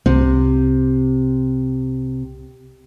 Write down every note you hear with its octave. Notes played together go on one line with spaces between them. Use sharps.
C2 C3